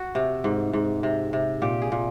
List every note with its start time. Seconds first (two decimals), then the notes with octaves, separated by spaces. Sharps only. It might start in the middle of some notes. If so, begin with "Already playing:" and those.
Already playing: F#4
0.15 C3
0.44 G#2
0.73 G#2
1.03 C3
1.33 C3
1.62 A#2 G4
1.82 G#4
1.92 A#2